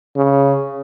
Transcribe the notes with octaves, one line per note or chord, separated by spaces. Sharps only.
C#3